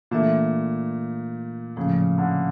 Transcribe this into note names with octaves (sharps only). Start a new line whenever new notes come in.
A#2 E3 A3 D4 A4 E5
A2 C#3 F3 A3
D3